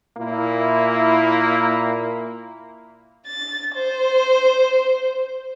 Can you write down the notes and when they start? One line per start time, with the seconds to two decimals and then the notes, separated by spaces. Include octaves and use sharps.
0.16 A#2 A#3 E4
3.27 A6
3.75 C5